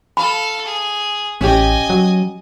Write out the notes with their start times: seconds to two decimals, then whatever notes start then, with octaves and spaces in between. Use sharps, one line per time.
0.17 A4 F5 B5
0.65 G#4
1.41 A1 C#4 G4 D#5 G#5
1.90 F#3